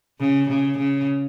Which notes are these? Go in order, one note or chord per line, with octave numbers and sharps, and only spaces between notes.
C#3
C#3
C#3